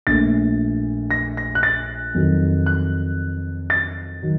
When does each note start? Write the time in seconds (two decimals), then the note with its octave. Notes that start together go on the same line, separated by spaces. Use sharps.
0.07 A#1 A#2 A3 A6
1.11 A#6
1.37 A#6
1.55 F#6
1.63 A6
2.14 F2 D#3 F#3
2.66 F#6
3.70 A6
4.23 D#3 F#3